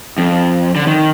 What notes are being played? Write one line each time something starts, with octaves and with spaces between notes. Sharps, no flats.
F2
D3
D#3